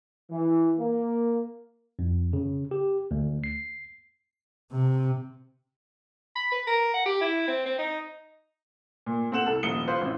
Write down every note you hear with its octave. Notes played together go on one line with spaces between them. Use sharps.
E3
A#3
F2
C#3
G4
D2
C7
C3
B5
B4
A#4
F#5
G4
E4
C4
C4
D#4
A#2
A#2 C4 A4 F#5 E7 F#7
C2 A4
D#1 A#1 D#6 C#7 G7
F4 B4 C5
A1 C4